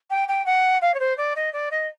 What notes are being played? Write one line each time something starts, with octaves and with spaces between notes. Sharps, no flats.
G5
G5
F#5
F5
C#5
C5
D5
D#5
D5
D#5